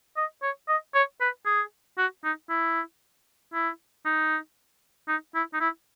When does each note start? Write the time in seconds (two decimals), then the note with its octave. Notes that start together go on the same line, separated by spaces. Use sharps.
0.17 D#5
0.43 C#5
0.69 D#5
0.95 C#5
1.21 B4
1.46 G#4
1.98 F#4
2.24 D#4
2.50 E4
3.54 E4
4.05 D#4
5.08 D#4
5.35 E4
5.53 D#4
5.61 E4